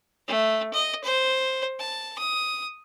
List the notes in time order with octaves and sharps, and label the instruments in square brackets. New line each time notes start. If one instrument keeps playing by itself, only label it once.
[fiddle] A3
D#5
C5
A5
D#6